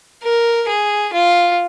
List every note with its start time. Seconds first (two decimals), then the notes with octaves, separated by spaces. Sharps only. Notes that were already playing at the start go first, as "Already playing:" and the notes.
0.24 A#4
0.69 G#4
1.13 F4